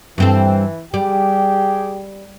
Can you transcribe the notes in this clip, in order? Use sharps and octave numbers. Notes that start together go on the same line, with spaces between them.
G2 E3 C4 A4
G3 G4 G#4 G5